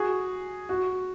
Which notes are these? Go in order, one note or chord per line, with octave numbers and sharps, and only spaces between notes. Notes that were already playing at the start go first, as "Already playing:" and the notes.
Already playing: F#4 G#4
F#4